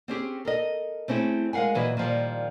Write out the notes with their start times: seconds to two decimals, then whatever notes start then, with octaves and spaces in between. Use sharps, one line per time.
0.08 C4 C#4 G4 G#4
0.45 A4 A#4 D#5
1.08 A3 C4 C#4 E4 G#4
1.53 G#3 A#4 F5 F#5 G#5
1.75 A#2 E3 F#3 B4 D#5
1.97 A#2 D#3 F3 G3